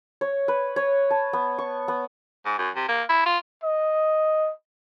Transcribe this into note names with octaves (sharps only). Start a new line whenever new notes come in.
C#5
B4
C#5
A5
B3
C#6
B3
G#2
F#2
C3
A#3
E4
F4
D#5